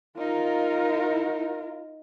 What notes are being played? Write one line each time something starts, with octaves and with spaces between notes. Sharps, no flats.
D#4 F4 A#4